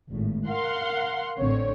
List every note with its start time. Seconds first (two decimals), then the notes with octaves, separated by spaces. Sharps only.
0.10 G#1 A2
0.48 A#4 F5 F#5 C6
1.38 A1 D3 C4 C#5